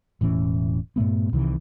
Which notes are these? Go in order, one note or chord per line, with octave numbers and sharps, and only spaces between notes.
E1 A2 E3 C#4
G2 A#2 A3 B3
C2 C3 D#3 E3